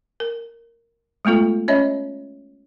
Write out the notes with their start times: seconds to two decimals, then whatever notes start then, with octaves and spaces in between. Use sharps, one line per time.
0.20 A#4
1.25 G#3 A3 B3 F4 A4
1.68 C#4 C#5 D#5 E5 B5